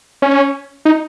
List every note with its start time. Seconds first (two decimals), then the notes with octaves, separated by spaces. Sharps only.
0.22 C#4
0.85 D#4